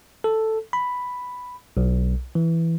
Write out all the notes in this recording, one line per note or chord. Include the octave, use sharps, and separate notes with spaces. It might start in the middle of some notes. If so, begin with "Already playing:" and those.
A4
B5
B1
E3